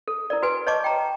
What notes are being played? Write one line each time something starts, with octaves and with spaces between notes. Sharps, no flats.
A4
E4 A#4 D5
F#4 B4 G#5
C#5 D#5 A5 C#6 D6
G5 A#5